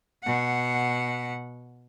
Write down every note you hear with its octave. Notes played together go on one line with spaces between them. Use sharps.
B2 F#5